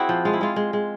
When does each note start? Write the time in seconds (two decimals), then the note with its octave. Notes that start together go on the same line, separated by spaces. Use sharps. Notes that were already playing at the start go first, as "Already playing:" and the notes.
Already playing: C4 E4 F#4 G#4
0.09 F3
0.25 G#3 F4
0.33 E4
0.41 G#3 F4
0.56 G#3
0.73 G#3